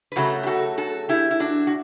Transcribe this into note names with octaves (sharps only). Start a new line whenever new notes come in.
B4
C#3 F#3 A3 F#4 A4
G4
F#4 A4
F#4 A4
E4 G4
E4
D4 F#4
F#4